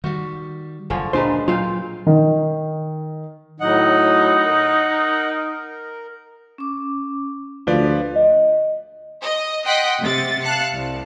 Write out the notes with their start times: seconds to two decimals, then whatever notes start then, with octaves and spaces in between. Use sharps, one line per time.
0.04 D#3 G3 F#4
0.90 F#1 D3 F3 C#4
1.13 D2 A#2 G#3 D4 B4 C5 A#5
1.48 A#2 F#3 F4 F5 G5
2.07 D#3
3.60 A2 F#3 D#4 D#5 F#5
4.46 A#4
6.58 C#4 D6
7.67 D2 F3 F4 B4 D5 F5
8.16 D#5
9.22 D#5
9.66 D#5 F#5 G5 C6 F#6 B6
10.01 C3 A6
10.43 F5 A5 F#6 C#7
10.74 C2